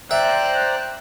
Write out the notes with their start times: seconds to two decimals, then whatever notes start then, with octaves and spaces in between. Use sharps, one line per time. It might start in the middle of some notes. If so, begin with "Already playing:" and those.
0.11 C5 D5 E5 G5 A#5 F#6